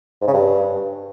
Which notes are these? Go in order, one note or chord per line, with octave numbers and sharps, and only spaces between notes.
G#2
C#3
G2